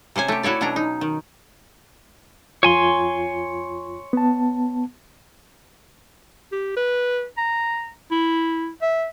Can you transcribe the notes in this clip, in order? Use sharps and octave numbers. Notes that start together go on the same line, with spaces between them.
C3 C#4 C5 G#5
A3 G4
E4 F#4 A4 C#5 D5
B2 F#3 C#4 D4 A#5
D#4
D#3
F2 F4 C#5 G#5 C6
B3 A5
G4
B4
A#5
E4
E5